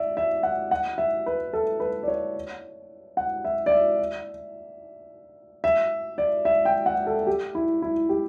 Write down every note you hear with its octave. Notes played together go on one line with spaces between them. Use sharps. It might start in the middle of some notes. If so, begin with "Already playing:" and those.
Already playing: D5 E5
E5
F#5
F#5
E5
B4
A4
B4
D5
C#5
F#5
E5
D5
E5
E5
D5
E5
G5
F#5
A4
G4
E4
E4
G4